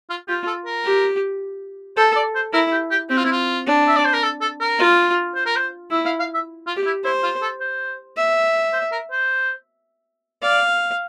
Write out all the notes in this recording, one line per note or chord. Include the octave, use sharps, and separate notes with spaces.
F4
F4 G4
A4
A#4
G4
A4 C5
D5
C5
E4 A#4
G4
G4
C4 G4
F4
E4
F4
D4
E5
D5
C5
A#4
A4
A4
A#4
F4
C5
A#4
C5
E4 E5
F5
F5
E5
F4
G4
E4
E4 C5
F4
A4
C5
E5
C5
A#4
C5
D5 F5